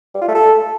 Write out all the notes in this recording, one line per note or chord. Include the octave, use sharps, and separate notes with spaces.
G3
F4
A3
A4